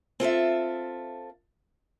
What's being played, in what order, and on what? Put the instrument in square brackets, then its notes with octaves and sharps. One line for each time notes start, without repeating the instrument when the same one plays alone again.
[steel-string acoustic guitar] C4 F4 A4 E5